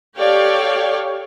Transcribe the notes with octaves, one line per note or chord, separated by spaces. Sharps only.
G4 A4 C#5 D5 F5 G5